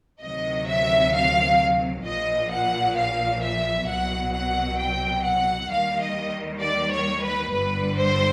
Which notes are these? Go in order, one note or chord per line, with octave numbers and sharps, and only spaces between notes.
D2 C3 D#3 F#3 D#5
E5
F5
A#1 A#2 F3 D#5
F#5
F5
E5
C2 B2 F#3 F#5
F#5
G5
F#5
D#2 D#3 G3 F5
D#5
D5
C#5
B4
G1 G2 D3 G3 B4
C5